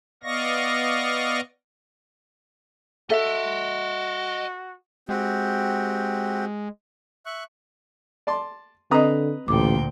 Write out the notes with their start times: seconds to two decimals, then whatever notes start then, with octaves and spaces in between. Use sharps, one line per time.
0.23 B3 D5 D#5 F5 C#6 A#6
3.10 F#4 A4 D#5 E5 C6
5.09 G#3 C4 F#4 G4
7.26 E5 C#6 F#6
8.27 D5 A5 C6
8.91 D3 C4 B4 D#5 A#5 D#6
9.48 A1 D2 A#2 G5 D6